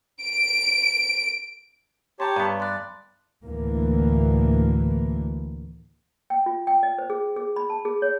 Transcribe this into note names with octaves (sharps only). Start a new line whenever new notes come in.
D7
G4 C#5 G5 A5 A#5 C6
G2 B3
D5 C6 F#6
D2 A2 D3 E3 A#3
G5
F4
G5
D#5
C5
G#4
G#4
B5
A5
G#4
C#5